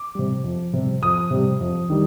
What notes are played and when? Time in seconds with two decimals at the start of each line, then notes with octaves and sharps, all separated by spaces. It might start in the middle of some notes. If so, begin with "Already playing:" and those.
Already playing: D6
0.15 C3 G3
0.44 F2
0.73 C3 G3
1.02 F2 D#6
1.31 C3 G3
1.61 F2
1.90 D#3 G3